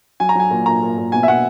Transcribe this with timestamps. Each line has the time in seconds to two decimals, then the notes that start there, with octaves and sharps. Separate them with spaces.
0.20 F#3 G#5
0.29 A#5
0.35 F#3 G#5
0.50 A#2
0.66 A#2 A#5
0.82 A#2
0.98 A#2
1.12 B2 G#5
1.23 E5
1.28 B2 F#5